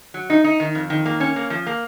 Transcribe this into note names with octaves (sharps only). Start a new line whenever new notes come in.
F#3
D#4
D#4
D#3
F2
D#3
A#3
C#4
A#3
F3
A#3